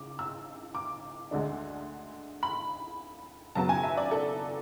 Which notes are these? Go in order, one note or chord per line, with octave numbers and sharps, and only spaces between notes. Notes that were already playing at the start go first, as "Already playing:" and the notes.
Already playing: C#3 D6
E6
D6
D2 D3 G#3 D4
B5
F#2 C#3 F#3 B3 A5
G#5
E5
D5
A4